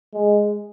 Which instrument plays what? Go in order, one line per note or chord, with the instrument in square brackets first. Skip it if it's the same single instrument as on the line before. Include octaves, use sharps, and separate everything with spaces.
[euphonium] G#3